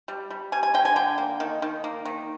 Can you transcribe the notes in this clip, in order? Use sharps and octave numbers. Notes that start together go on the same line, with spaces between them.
G3
G3
G3 G#5
G#5
D3 G5
G#5
D3 G5
A#3
D#3
D#3
A#3
D#3